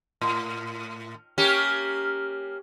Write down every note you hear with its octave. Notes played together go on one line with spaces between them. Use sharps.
A2
A#3 C#4 G4